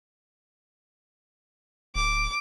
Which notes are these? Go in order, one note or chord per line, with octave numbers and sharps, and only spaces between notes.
D1 D6